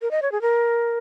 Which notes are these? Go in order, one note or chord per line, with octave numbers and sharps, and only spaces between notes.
A#4
D#5
C#5
G#4
A#4